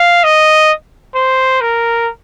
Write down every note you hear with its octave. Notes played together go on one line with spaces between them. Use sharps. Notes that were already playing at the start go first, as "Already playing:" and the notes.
Already playing: F5
D#5
C5
A#4